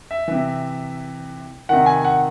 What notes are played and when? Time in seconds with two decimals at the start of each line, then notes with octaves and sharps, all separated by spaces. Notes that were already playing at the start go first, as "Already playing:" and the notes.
0.11 E5
0.28 C3 E3
1.69 C3 D#3 F#5
1.86 G#5
2.05 F#5